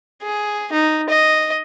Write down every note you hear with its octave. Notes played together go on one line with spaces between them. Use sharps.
G#4
D#4
D#5